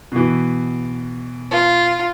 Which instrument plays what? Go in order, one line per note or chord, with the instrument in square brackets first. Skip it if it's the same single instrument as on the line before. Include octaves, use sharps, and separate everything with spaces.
[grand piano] B2 E3
[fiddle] F4